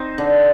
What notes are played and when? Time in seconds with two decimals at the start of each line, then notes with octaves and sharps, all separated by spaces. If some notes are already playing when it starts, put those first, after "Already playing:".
Already playing: C4 D#4
0.18 D3